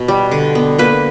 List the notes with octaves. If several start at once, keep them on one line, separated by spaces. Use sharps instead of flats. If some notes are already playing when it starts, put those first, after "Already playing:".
Already playing: B2
G3
D3
B3
A#3 B4